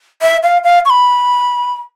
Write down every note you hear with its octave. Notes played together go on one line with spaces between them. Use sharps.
E5
F5
F5
C#6
B5